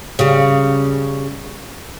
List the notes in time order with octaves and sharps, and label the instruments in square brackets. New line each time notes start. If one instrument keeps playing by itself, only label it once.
[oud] C#3 G3